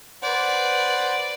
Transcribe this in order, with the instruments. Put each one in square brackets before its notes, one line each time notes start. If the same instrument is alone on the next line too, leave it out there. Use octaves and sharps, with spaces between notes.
[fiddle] B4 D5 [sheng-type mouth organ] C5 F#5